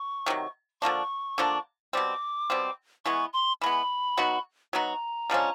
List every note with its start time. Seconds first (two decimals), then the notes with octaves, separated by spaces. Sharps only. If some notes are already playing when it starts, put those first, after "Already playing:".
Already playing: C#6
0.26 C3 D#3 F#3
0.82 D3 F3 A#3 D4 C#6
1.38 D3 F3 A#3 D4
1.93 B2 G3 C4 D6
2.50 B2 G3 C4
3.05 E3 G#3 B3 C#6
3.33 C6
3.61 E3 G#3 B3 B5
4.17 F#3 B3 D#4 F#4
4.73 F#3 B3 D#4 F#4 A#5
5.30 D3 F3 G#3 C#4